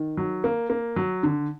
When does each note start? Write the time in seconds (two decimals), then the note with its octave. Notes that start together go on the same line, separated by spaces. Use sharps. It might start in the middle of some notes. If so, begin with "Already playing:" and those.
Already playing: D#3
0.17 F#3
0.44 A#3
0.70 A#3
0.96 F#3
1.23 D3